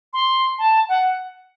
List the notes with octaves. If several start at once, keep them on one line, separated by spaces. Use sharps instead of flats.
C6
A5
F#5